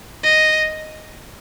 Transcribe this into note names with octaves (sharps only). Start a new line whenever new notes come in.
D#5